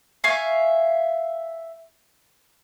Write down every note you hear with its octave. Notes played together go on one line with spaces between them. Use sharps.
E5 F5 G#5 C#6